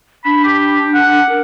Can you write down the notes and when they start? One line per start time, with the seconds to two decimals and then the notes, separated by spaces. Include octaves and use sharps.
0.25 D4 B5
0.45 G4
0.94 F#5
1.29 A#4